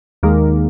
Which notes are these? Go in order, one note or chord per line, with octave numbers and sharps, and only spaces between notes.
D#2 D#3 G#3 A#3